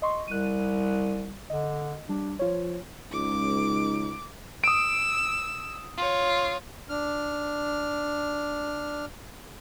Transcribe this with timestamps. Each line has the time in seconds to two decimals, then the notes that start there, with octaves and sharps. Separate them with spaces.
0.02 D#5 C6 C#6
0.28 C2 F#6 D#7
1.50 D3 D#5
2.09 G3 D4
2.39 F3 F4 C#5
3.12 C#2 D#4 D6
4.64 D#6 E6 D7
5.98 F4 C#5
6.89 D4 F6